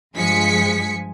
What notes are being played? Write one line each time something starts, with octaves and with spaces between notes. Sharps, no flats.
G2 F3 G#3 G#5 B6 C#7